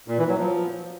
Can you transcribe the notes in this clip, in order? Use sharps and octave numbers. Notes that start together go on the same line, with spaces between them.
A#2
E3
F#3
F3